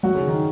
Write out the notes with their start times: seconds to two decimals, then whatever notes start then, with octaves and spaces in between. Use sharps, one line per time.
0.03 F#3 F#4
0.15 C#3 C#4
0.27 D#3 D#4